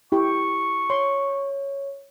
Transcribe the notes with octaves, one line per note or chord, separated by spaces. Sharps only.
E4 G4 C#6
C#5 C6